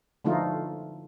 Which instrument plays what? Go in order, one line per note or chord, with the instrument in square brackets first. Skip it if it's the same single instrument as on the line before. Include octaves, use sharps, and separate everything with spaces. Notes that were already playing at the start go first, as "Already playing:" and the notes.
[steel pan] D3 F3 A3 D#4 F4